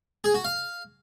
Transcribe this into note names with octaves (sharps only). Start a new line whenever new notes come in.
G#4
F#4
F5